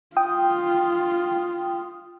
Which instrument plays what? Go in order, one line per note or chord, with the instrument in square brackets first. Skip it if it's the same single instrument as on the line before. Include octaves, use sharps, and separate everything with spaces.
[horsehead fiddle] F4 [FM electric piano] G5 D#6